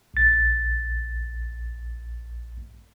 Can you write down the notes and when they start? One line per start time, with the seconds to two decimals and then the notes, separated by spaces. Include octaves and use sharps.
0.14 A#1 A6